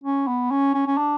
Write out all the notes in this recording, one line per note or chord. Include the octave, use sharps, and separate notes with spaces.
C#4
B3
C#4
C#4
C#4
D4